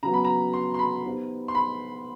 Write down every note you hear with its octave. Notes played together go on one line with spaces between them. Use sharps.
C#3 F#3 B3 A#5
B5
A#5
C6
C6
B5
B3 D#4 G4 C5
C6
B5